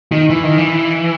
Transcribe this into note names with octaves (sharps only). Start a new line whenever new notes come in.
D#3
E3
D#3
E3